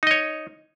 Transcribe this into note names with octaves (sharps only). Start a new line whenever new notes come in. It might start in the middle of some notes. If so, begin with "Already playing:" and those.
D#4 C#5 D#5